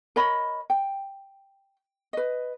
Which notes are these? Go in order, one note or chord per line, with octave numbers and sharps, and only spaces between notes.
A#4 C#5 D#5 B5
G5
B4 D#5